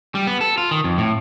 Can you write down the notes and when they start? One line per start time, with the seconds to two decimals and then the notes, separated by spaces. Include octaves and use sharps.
0.15 G3
0.27 B3
0.41 A4
0.58 F4
0.71 D#3
0.84 F2
0.98 A2